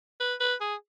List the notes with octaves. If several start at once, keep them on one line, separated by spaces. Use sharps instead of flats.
B4
B4
G#4